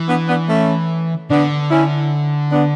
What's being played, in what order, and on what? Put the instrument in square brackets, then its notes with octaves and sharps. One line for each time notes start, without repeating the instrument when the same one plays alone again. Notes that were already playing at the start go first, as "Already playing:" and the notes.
Already playing: [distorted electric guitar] E3
[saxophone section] B3 D4
B3 D4
A3 C#4
[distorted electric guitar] D3 [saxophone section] B3 D4
[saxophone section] C#4 E4
B3 D4